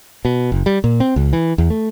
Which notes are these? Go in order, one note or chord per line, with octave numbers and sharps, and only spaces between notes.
B2
F#1
G3
A#2
C4
C#2
E3
E2
A3